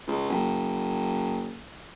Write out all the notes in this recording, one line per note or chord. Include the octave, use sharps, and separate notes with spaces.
C#2
F#1